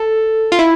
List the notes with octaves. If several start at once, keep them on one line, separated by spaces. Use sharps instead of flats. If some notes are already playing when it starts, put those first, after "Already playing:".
Already playing: A4
F4
E4